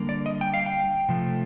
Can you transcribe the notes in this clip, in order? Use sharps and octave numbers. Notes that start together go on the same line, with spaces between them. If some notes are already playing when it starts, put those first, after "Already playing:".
Already playing: D3 G3 A#3
D5
D#5
G5
F5
G5
C3 F3 A3